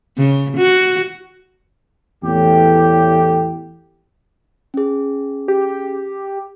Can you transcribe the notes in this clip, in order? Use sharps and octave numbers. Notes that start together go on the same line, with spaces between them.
C#3
F#4
E2 A2 G4
C#4 G#4
G4